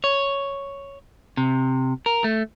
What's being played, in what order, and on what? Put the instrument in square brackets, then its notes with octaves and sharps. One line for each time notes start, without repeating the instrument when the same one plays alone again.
[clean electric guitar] C#5
C3
A#4
A3